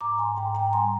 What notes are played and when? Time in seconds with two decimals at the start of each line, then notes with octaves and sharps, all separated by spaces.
0.01 G#2 A#5 D6
0.18 G#5 C6
0.37 G#2 G5 A#5
0.55 G5 A#5
0.73 G3 G#5 C6